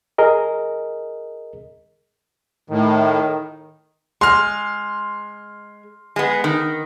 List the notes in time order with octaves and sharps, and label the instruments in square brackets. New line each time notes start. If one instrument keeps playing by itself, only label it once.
[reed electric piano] G#4 A#4 D#5
[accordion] A2 [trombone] D#3
[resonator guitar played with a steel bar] G#3 [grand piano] C6 F6
[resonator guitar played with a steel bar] G#3 B3
D#3